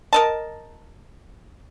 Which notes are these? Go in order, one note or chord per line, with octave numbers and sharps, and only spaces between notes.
A#4 D#5 A5